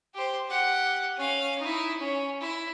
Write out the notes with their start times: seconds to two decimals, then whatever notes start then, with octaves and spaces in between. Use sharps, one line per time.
0.14 G4 C5
0.48 G4 F#5
1.17 C#4 F5
1.60 D#4 E4
1.98 C#4
2.41 E4